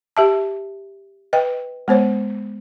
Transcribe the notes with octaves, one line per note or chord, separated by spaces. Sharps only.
G4 E5 A5
B4 D#5 G5
G#3 B3 C5 C#5